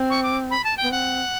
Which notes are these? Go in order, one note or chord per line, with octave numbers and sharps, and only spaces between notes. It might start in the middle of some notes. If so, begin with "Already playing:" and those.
Already playing: C4
C#6
D6
B5
A5
G5
B3
C4 F#5